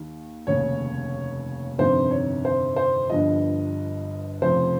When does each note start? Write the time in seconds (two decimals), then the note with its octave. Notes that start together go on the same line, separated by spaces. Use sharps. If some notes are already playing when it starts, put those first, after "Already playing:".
Already playing: D#2 D#3
0.47 F1 D#2 C#3 C#5
1.78 G1 F2 C3 D#3 C5
2.11 C#5
2.45 C5
2.76 C5
3.10 G1 G2 F3 D#5
4.42 F1 F2 C#3 F3 C5